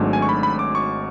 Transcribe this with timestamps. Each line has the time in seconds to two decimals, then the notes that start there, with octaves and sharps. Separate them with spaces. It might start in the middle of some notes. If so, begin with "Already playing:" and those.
Already playing: G#1 G#2 F#3 A3 D4
0.13 G#5
0.22 C#6
0.29 B5
0.43 B5
0.59 D6
0.75 C#6